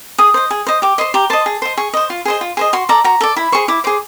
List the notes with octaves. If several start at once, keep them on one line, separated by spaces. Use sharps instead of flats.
G#4 D#6
C5 D#5
G#4
C5 D#5
G4 D6
C5 D#5 C6
G4 A#5
C5 D#5 A5
G#4
C5 D#5
G#4 C#6
C5 D#5
F4
G#4 C5 D#5
F4
G#4 C5 D#5
F#4 C6
A4 D5 A#5
F#4 A#5
A4 D5
E4 B5
G#4 C5 C#6
E4 D6
G#4 C5 D6